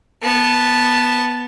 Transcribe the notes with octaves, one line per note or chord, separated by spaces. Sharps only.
B3 A5